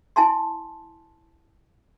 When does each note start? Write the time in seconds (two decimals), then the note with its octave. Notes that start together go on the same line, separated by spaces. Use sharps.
0.16 E4 G#5 A5 C6